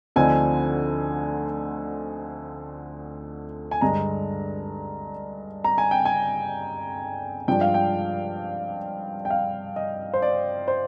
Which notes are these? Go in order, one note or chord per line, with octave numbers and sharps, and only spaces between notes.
D2 D3 F3 C4 D#4 G#5
G#5
G2 D3 G#3 A#5
A#5
G#5
G5
G#5
G2 F3 G#3 D4 G5
F5
G5
G5
F5
D#5
C5
D5
C5